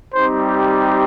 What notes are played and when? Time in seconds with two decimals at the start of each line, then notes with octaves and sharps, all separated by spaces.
0.14 G3 C4 D#4 G4 C5